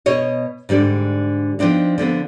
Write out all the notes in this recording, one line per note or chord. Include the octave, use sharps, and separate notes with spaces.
B2 C#5 D#5
G#2 D3 G3 D4
F3 B3 C4 D4 D#4
D3 F3 B3 C4